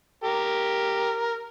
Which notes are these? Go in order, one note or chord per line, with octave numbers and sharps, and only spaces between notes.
G4 A#4